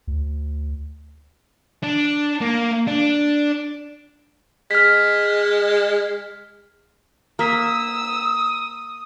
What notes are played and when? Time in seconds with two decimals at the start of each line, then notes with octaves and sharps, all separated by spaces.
0.07 D2
1.83 D4
2.41 A#3
2.87 D4
4.71 G#3 F6 B6
7.39 A#3 A#5 D#6 E6 B6